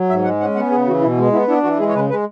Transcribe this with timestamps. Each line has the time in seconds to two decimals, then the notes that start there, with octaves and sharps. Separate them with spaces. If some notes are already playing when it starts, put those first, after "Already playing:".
Already playing: F#3
0.09 G#2 E5
0.24 G#3 F#5
0.40 C#4 F#5
0.55 B3 F#5
0.71 C#3 G#4
0.86 E3 F#4
1.01 B2 E4
1.18 G#3
1.32 B3 E4
1.48 D4 E4
1.63 E3 F#4
1.79 G#3 G#4
1.89 C#5
1.94 C#3 B4
2.09 G#3 B4